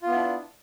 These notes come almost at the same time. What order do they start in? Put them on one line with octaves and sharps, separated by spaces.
F4 B3 E4 D4